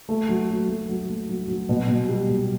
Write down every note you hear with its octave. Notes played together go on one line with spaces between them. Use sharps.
A3
F#3
F#3
A3
F#3
A3
F#3
F#3
B2
B2
G3
B2